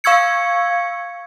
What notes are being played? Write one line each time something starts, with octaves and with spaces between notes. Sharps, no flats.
F5 C#6 E6 G#6 C#7